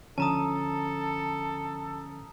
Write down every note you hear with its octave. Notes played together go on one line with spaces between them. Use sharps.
D3 F3 C#4 A4 A5 A#5 D#6